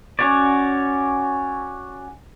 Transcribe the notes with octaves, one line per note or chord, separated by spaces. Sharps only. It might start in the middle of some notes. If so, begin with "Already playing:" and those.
C#4 F#4 C#5 D5